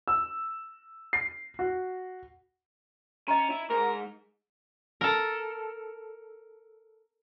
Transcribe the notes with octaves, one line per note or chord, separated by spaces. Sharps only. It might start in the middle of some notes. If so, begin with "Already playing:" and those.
E6
C7
F#4
C#4 D#5 A#5
E4
G#2 A#4
A4 A#4